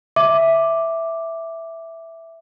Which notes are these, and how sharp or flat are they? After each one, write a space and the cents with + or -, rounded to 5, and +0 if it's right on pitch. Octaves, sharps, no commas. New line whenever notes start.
E5 +0 D6 +0